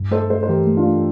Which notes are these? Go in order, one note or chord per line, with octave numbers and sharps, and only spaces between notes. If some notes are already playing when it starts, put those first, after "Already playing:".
Already playing: G2
A3 A4 C5
A3 A4 C5
C5
E3 G4 A#4
A3
D4 F4
A3